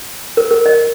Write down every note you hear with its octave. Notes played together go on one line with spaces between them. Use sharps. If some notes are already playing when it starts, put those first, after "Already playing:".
A#4
A#4
D#5